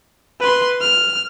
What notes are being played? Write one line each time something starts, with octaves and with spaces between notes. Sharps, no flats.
B4 C6
F6